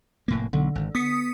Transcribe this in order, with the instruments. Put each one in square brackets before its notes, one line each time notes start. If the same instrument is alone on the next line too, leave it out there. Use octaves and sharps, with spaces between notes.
[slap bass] F1 A2 A#3
[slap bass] B1 [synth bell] D3
[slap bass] G#1
[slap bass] B3 [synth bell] D#6 B6 C#7